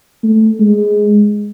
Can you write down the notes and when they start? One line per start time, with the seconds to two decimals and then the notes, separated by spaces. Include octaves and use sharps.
0.24 A3
0.60 G#3